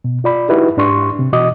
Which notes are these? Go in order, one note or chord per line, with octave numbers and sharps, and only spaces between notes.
B2
F4 D5 B5
D#4 E4 F#4 G4 B4 E5
G#2 D4 G4 C6 C#6
C3
B2 E3 F#4 D#5 D6 D#6